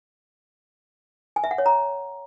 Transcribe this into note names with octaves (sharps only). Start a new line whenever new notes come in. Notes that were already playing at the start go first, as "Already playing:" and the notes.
G#5
E5
F#5
C#5
A#5